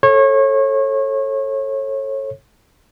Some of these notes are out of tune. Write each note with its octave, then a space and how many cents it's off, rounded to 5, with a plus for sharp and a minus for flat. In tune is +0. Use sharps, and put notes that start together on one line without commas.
A4 +0 C#5 -30